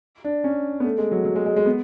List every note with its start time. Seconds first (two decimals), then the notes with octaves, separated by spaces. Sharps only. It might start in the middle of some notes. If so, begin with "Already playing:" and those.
0.25 D4
0.44 C#4
0.80 B3
0.84 A3
0.98 G#3
1.12 F#3
1.25 F#3
1.35 G#3
1.46 G#3
1.56 G#3
1.66 B3